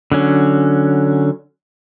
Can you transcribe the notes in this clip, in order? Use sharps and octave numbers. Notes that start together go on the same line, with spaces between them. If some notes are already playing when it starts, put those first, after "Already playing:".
D3 F#3 C#4